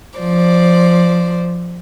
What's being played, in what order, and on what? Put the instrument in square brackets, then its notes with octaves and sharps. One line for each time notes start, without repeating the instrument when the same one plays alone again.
[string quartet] F3 C5 D5